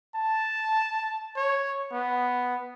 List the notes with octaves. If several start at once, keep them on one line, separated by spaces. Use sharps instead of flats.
A5
C#5
B3